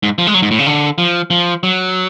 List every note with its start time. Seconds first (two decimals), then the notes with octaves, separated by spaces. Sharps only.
0.03 G#2
0.18 F3
0.27 G#3
0.34 F#3
0.42 G#2
0.51 A2
0.59 C#3
0.66 D3
0.98 F3
1.31 F3
1.63 F#3